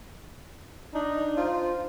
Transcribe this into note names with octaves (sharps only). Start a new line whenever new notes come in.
D4 D#4
F4 C5